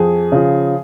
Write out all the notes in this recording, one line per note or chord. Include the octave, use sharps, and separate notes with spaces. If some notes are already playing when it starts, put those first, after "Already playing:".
Already playing: F2 G#4
C#3 F3